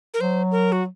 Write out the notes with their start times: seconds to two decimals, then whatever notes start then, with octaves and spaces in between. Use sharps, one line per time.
0.14 A#4
0.21 F#3 C5
0.52 A#4
0.72 F#4